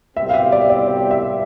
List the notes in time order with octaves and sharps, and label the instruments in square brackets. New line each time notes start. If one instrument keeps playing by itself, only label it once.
[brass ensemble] C2 B2 G3 C4 G4 [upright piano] E5
[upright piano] F5
E5
D5
D5
D5
E5